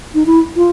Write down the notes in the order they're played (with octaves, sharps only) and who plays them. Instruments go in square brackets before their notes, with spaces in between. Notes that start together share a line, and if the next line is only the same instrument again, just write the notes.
[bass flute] D#4
E4
F4